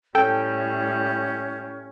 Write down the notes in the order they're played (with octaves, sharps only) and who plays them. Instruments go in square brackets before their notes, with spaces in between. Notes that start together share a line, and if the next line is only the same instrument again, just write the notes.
[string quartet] A2 G3 [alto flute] C#4 [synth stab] A4 G5